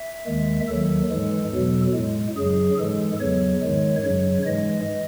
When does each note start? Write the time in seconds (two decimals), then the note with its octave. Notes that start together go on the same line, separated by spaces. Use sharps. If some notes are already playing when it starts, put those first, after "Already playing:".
Already playing: E5
0.27 D#2 D#3 G#3
0.68 D#2 D#3 F#3 A4
1.10 G#2 E3 G#3
1.52 E2 B2 F#3
1.94 A2 G#3
2.36 F#2 C#3 F#3 G#4
2.78 G#2 E3 G#3 A4
3.20 E2 C#3 F#3 C#5
3.63 G#2 D#3 G#3
4.04 F#2 C#3 F#3 C#5
4.46 G#2 E3 G#3 D#5